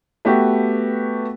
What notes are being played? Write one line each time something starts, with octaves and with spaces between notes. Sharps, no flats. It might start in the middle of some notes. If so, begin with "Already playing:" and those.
A3 B3 F#4 G4